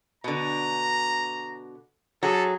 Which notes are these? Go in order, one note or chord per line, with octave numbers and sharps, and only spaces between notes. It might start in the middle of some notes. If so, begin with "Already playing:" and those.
B2 D3 A#5
F#3 G#4 A4